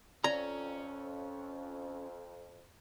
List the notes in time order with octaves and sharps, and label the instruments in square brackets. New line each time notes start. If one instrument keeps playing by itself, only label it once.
[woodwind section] F2 [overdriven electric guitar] C#4 [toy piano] D5 [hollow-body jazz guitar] A#5